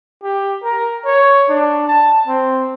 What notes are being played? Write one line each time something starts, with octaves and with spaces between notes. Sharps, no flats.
G4
A#4
C#5
D4
A5
C4